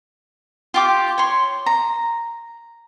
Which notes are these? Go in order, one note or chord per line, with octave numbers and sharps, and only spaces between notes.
F4 G4 D6
C#5 C6
A#5